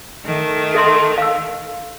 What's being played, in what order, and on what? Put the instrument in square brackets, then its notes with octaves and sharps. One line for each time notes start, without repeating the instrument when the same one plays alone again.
[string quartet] D#3 A3
[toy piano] A4 E5 C6
F5 E6